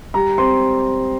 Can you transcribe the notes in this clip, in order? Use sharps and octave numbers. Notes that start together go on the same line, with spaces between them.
G3 A#5
C4 C6